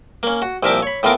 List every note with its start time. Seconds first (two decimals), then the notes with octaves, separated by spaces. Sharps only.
0.23 A#3 C#4
0.42 F#4
0.63 C2 A#2 F3 A#4 E5 D6
0.83 C#5 B5
1.03 A2 E3 B3 F4 A#4 D6